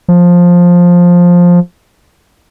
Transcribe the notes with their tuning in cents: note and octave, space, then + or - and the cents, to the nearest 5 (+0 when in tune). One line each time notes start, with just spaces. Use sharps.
F3 +10